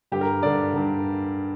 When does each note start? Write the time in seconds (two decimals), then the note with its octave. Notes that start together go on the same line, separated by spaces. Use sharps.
0.12 G2 D3 G4
0.21 A#4
0.42 G2 D3 D5
0.74 G2 D3